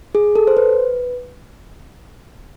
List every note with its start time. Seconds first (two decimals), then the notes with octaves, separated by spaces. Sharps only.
0.15 G#4
0.36 A4
0.47 C5
0.57 B4